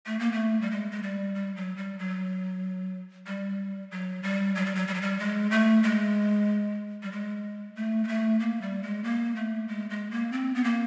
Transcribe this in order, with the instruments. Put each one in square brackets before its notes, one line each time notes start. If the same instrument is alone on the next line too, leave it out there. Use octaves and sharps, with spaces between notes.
[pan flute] A3
A#3
A3
G3
G#3
G#3
G3
G3
F#3
G3
F#3
G3
F#3
G3
F#3
G3
F#3
G3
F#3
G3
G#3
A3
G#3
G3
G#3
A3
G#3
A3
A#3
G3
G#3
A#3
A3
G#3
G#3
A#3
C4
B3
A#3